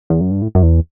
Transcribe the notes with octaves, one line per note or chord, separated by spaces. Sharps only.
E2
F#2
G2
A2
F#2
E2